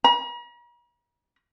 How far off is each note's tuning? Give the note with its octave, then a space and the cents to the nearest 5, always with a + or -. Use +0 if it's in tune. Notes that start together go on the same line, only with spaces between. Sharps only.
A#5 +45